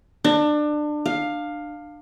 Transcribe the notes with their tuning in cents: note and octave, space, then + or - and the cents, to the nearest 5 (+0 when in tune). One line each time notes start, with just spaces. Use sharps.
D4 +25
F5 +10